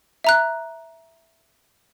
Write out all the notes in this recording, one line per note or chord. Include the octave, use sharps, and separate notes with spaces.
E5 A#5 F#6